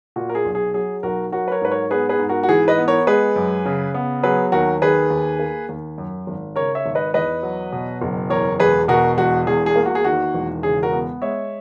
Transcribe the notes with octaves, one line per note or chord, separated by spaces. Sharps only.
A#2 F#4
A#4
G#4
B1
G#4
F#3 G#4
B1 F#4 A#4
F#3 F#4 A#4
B4
A#4 C#5
G#2 B4
A#4 C#5
B3 G#4 B4
G#4 B4
G#2
F#4 A#4
F#4
E3 G#4
B4 D#5
B3
A#4 C#5
G#3 G#4 B4
F#2
C#3
B3
F#3 G#4 B4
D#2 F#4 A#4
D#3 G#4 B4
D#2
A#3
D#2
F#2
G#1
C#3 A#4 C#5
C#5 E5
G#1
B4 D#5
E2 B4 D#5
F#3
B2
F#1
E2 A#4 C#5
E1 G#4 B4
B2 F#4 A#4
E1 F#4
E2 G#4
G#4
A#3
F#4
G#4
D#3 F#4
E1
C#3 G#4
F#4 A#4
B3
G#3 C#5 E5